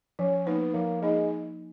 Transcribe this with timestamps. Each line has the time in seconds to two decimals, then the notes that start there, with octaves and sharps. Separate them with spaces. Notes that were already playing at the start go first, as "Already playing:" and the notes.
0.19 F3 C#4
0.47 A#3 B3 D#4
0.74 F3 A#3
1.02 G#3 A#3 D#4